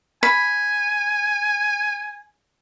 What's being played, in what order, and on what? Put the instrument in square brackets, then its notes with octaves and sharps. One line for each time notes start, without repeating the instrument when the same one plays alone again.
[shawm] G#5 [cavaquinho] B5